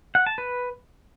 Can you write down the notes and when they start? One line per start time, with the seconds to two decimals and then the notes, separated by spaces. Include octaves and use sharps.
0.15 F#5
0.26 A5
0.38 B4